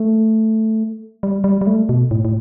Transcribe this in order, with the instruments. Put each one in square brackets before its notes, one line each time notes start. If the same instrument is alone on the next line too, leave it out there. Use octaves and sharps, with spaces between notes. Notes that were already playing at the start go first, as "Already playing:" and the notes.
Already playing: [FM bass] A3
G3
G3
G3
A3
B2
A2
A2